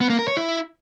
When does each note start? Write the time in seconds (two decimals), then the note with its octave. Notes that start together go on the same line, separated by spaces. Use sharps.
0.01 B3
0.10 A#3
0.19 A#4
0.28 C#5
0.37 E4